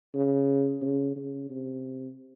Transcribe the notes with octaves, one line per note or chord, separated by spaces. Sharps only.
C#3
C#3
C#3
C3